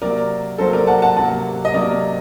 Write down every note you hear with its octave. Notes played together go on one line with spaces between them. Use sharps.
C3 F#3 A#3 A#4 D5
C3 F#3 A#3 A4 C5
A#4 D5
F#5 A5
F#5 A5
C3 F#3 A#3 F#5 A5
D#5
C3 F#3 A#3 A#4 D5